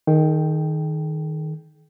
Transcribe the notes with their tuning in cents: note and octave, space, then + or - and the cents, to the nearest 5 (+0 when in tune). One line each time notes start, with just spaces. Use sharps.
D#3 +0 G#4 +40 G5 +0